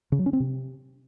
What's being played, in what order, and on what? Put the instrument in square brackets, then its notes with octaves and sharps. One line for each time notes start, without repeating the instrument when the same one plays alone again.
[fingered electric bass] C#3
F#3
C#4
C4
C3